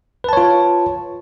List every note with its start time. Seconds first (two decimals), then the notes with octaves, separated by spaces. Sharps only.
0.24 B4
0.29 A5
0.33 C#5
0.37 F4